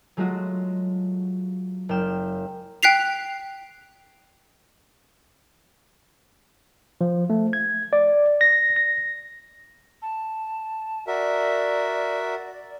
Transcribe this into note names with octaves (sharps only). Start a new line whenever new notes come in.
F#3 G#3 A3 F4 F#4
F#1 G5 F6 E7
G5 F#6 B6 C7 F7
F3
A3
G#6
D5
A#6
A#6
A5
F#4 A#4 D5 E5